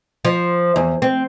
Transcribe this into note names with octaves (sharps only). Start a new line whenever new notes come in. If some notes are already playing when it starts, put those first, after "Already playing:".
F3
E2
C4